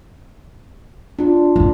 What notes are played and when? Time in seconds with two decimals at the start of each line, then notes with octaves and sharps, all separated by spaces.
1.19 D4 F4
1.56 F1 D#3